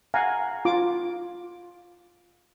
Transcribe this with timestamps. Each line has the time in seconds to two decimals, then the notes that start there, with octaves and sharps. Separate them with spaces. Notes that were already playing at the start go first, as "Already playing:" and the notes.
0.14 F5 F#5 G#5 A#5
0.65 F4 D6